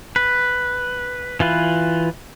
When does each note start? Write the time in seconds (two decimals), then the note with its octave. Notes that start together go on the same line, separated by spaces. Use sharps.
0.16 B4
1.40 E3 F4 B4